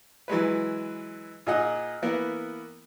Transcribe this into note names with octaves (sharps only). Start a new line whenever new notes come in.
E3 F#3 G#3 B4
A#2 D#4 G#4 D#5 F#5
E3 A#3 B3 A#4